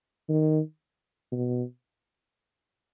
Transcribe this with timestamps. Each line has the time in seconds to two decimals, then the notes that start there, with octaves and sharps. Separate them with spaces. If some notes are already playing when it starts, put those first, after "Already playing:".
0.29 D#3
1.32 B2